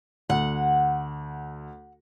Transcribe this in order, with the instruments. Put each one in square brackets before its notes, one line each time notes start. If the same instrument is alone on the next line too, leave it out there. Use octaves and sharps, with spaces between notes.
[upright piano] D2 [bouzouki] F#5